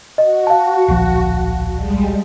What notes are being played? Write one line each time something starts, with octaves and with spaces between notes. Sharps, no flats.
F#4 D#5
F5 A5
D1 A#1 F3
G3 G#3